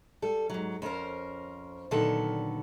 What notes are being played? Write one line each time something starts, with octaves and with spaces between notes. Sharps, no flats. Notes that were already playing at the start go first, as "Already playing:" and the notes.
G3 A4
G#2 F#3
F2 C#4 A#4 C5
A#2 D3 D#3 F#3 B3 A4